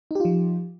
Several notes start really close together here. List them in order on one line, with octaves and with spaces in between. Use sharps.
D#4 G4 F4 F3